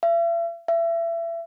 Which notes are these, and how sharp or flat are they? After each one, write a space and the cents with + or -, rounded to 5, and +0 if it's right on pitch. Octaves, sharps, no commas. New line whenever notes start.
E5 +45
E5 +30